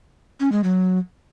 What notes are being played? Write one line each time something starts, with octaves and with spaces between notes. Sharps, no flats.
C#4
G#3
F#3